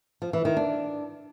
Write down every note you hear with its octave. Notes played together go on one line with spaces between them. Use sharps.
F3
E3
D#3
D4